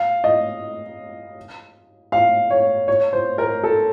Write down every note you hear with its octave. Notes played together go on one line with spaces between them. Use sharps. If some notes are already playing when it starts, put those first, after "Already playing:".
Already playing: F5
D#5
F5
C#5
C#5
C5
A#4
A4